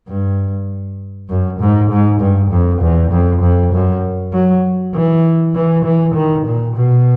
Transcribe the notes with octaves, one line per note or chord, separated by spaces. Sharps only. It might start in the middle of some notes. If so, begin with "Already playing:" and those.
G2
F#2
G#2
G#2
G2
F2
E2
F2
F2
F#2
F#3
E3
E3
E3
D#3
A#2
B2